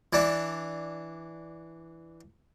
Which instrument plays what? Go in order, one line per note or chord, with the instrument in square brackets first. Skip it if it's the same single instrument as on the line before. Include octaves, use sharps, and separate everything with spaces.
[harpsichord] E3 D4